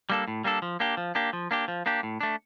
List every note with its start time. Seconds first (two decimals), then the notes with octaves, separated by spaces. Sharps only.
0.10 G3 A#3 D4 A4
0.28 A2
0.44 G3 A#3 D4 A4
0.62 F3
0.80 A#3 D4 G4
0.97 F3
1.15 A#3 D4 G4
1.33 F3
1.51 A#3 D4 G4
1.68 F3
1.86 A#3 D4 G4
2.03 A2
2.21 A3 D4